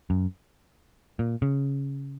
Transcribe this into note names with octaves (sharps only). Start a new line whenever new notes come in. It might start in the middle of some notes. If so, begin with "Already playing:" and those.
F#2
A#2
C#3